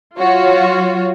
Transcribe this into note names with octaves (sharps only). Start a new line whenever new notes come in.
F#3 F4 F#4 C#5